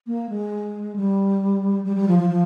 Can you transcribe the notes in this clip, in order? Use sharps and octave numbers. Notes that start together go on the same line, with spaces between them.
A#3
G#3
G3
G3
G3
F3
F3
F3